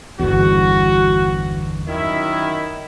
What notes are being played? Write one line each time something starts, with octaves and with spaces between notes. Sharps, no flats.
G1 E2 F#4
F#2 D#3 E4